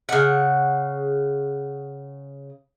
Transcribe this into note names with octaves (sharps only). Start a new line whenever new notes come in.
C#3 F#5